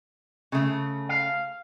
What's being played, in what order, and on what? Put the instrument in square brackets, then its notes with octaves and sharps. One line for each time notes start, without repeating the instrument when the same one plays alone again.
[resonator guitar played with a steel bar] C#3 A3
[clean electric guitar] F5